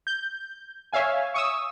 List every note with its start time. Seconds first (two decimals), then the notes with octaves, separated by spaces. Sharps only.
0.07 G6
0.93 C#5 E5 F5 G#5
1.34 C#6 D#6 E6